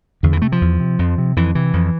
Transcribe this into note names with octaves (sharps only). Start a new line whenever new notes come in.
E2 D3
E3
C3 A3
F3
E2
C3
F2
C3
F2 E3
C3 E3
F2